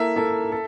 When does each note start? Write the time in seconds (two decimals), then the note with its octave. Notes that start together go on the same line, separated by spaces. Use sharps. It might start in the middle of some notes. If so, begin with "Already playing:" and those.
Already playing: A#3 E4 A4 E5
0.16 A#3 E4 A4
0.52 A4